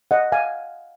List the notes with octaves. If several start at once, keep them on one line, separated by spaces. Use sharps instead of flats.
D#5 F#5
F5 G#5